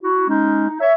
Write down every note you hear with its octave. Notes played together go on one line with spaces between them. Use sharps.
E4 F#4
G#3 C#4 D#4
D#4
C#5 E5